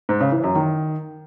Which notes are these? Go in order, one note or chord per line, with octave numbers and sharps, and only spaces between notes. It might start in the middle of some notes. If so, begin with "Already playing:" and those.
G#2
C#3
E3
F#2
D#3